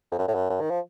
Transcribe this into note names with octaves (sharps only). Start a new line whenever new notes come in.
F2
F#2
A2
F#2
F#2
D#3
F3